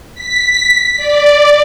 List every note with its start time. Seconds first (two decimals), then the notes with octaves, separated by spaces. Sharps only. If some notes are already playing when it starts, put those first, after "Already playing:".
0.14 B6
0.97 D5